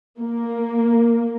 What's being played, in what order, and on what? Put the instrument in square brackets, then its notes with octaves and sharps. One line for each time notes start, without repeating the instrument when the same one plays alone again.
[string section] A#3